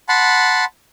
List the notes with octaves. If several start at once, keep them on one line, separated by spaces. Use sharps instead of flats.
F#5 A5 B5 C6